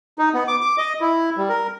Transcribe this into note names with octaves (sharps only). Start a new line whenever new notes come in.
D#4
B3
D6
D6
D#5
E4
G3
A#4